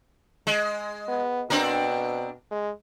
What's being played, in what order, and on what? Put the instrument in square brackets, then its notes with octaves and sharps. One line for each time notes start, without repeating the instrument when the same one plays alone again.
[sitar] G#3
[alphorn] B3
[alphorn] B2 [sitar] C4 D4 A#4
[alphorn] G#3